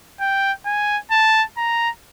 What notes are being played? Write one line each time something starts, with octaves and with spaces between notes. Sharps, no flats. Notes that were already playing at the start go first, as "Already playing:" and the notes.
G5
G#5
A5
A#5